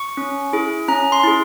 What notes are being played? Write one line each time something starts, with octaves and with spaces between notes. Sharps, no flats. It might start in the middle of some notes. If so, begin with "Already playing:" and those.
Already playing: C#6
C#4
E4 G#4
C#4 A#5
C6
E4 G#4